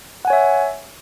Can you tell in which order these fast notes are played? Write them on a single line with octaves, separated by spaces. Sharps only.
F#5 G#5 C#5 E5